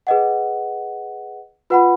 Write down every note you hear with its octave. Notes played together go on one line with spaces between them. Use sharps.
G#4 B4 D#5 F#5
F4 B4 F#5 B5